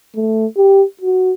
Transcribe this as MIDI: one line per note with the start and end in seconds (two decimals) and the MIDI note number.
0.16 0.46 57
0.57 0.84 67
1.01 1.34 66